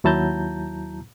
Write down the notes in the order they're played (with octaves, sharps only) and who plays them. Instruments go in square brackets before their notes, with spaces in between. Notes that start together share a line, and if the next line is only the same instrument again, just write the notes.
[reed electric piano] D#2 F#3 E4 A5 A#5 G6